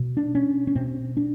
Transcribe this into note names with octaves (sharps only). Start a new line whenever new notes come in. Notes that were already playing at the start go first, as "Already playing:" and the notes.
Already playing: B2
D4
C#4
C#4
B2 C4
D4